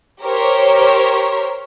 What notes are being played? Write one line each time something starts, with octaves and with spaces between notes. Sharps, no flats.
G4 A#4 C5 C#5